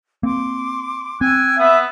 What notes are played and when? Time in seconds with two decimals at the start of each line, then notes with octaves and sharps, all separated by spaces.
0.23 A#3 C4 C6 D6
1.21 C4 G5 G#5 E6 F#6
1.59 B3 E5 B5